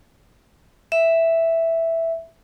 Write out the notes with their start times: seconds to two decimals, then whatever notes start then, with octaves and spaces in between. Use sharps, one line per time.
0.92 E5